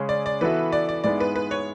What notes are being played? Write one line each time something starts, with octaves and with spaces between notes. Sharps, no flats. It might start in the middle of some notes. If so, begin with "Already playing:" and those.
Already playing: C#3 G#3 C#4 G#4
D5
D5
E3 B3 F#4 A4 B4 E5
D5
D5
G#2 G#3 B3 E4 D5
B4
B4
C#5